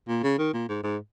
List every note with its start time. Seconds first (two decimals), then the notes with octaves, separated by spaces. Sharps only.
0.08 A#2
0.23 C#3
0.38 D#3
0.54 A#2
0.69 G#2
0.83 G#2